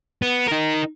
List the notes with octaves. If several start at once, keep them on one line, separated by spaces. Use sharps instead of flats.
B3
D#4 A#4